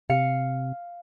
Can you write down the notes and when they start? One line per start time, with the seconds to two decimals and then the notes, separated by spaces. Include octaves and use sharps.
0.10 C3 F5 C#7